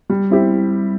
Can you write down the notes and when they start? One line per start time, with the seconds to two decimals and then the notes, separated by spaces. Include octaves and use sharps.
0.10 G3
0.30 C4 E4 G4